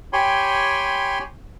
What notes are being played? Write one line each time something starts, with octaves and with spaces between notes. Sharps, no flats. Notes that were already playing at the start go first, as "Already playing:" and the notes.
G4 C#5 G5 G#5 B5 C6